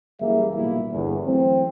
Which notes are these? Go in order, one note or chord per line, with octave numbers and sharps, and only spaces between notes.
F#1 E3 G3 A#3 G#4 E5
B1 A#2 G3 A#3 E4
G1 E2
E3 F#3 A3 C4